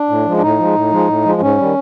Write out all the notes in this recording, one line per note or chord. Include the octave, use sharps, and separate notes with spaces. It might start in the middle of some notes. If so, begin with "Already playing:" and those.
Already playing: D4
A2
F3 G#3
D4
A2 D#4
F3 G#3
A2
F3 G#3
A2
F3 G#3
G#2 C#4
D#3 G3